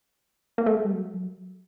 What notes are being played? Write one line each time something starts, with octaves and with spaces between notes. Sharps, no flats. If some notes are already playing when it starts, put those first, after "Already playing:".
A#3
A3
G#3
G3
F#3